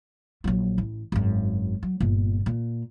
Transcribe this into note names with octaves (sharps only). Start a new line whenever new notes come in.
A#1 F#3
A1
G#1 F#2
F#3
G1 A#2
A#2